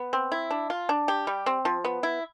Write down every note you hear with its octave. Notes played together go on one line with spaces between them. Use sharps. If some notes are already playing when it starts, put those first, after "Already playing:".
Already playing: B3
C4
E4
D4
F4
D4
G4
G3
C4
F3
B3
E4